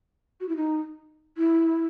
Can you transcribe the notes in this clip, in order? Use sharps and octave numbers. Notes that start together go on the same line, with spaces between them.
F#4
E4
D#4
E4